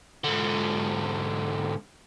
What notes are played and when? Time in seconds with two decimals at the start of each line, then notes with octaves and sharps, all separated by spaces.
0.24 G#2 D3